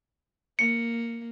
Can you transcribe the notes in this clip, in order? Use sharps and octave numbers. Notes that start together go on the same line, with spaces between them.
A#3 C#7